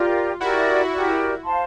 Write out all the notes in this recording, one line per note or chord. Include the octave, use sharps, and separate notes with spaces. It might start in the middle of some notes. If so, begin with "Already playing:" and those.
Already playing: F4 G4 A#4 D5
E4 F#4 G4 A#4 D5
G4 A#4 D5
C5 F5 A5 C6